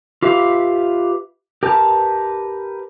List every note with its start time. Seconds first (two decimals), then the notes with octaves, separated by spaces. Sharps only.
0.22 F4 G4 B4 E5 F5
1.63 G4 A#4 B4 A5